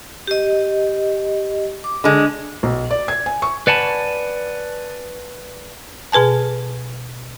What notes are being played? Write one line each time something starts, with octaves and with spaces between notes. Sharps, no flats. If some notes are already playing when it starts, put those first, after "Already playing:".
G4 D#5
D6
D3 G#3
B1
D5
G#6
G#5
C#6
B4 D5 F#5 G#5 A5 B5
B2 G#4 B4 G#5 A5